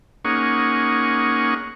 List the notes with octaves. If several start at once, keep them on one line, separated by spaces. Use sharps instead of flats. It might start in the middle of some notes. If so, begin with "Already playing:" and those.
A#3 C#4 D#4 G#4 F#5 C#6